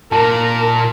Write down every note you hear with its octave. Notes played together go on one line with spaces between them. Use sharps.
A#2 A#4 A5